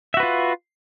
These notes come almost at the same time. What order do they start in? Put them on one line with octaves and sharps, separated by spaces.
E5 F#4 B4 F4